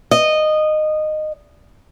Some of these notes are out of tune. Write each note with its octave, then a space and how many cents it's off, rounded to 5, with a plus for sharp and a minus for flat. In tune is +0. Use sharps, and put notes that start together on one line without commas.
D#5 -15